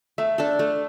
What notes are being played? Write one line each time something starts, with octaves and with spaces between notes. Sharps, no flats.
A3 E5
D4 A4
A3